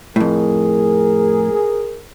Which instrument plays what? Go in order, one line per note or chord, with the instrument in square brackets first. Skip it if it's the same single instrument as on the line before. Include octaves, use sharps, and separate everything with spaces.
[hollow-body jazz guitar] F2 A2 [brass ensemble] G#4 A#4